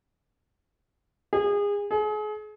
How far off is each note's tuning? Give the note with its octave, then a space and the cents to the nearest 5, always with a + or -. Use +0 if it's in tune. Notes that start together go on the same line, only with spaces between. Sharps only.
G#4 -30
G#4 +35